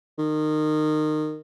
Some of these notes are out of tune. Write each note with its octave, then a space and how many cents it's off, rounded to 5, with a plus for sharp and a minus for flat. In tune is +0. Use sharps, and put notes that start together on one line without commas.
D#3 -20